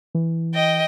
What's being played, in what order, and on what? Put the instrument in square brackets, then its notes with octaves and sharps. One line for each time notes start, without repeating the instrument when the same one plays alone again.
[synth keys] E3
[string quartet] D#5 G5